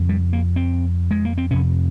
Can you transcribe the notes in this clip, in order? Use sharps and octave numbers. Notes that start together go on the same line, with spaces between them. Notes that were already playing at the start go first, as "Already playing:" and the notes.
Already playing: F2 C#3
G3
A#3
C4
G#3
A#3
C4
F2 C3 C#4